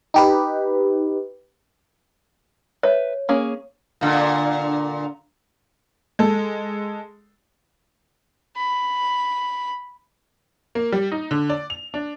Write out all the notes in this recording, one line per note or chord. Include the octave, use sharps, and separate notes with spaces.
D#4 G4 B4
B4 C#5 E5
A#3 C#4 G#4
A#2 D3
G#3 A4
B5
A#3
G3
D#4
D3
D5
F7
D4